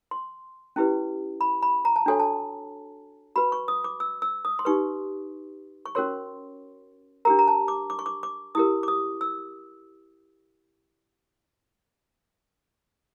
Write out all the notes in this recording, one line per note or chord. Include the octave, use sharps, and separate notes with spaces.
C6
C#4 E4 G4 B4
B5
B5
A#5
A5
D4 F#4 A4 C#5 G#5
A5
F#4 B4 B5
C#6
D#6
D6
E6
E6
D#6
C6
D#4 G4 B4 C#6
C#6
C#4 F#4 A#4 C#5 C6
D4 G4 A#4 A#5
A#5
A5
D6
D6
C#6
D6
D6
E4 G4 A#4 D#6
D6
D#6
E6